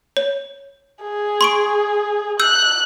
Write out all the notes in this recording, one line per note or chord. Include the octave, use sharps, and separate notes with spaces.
C#5
G#4
C6 C#6 D7
E6 F#6 G6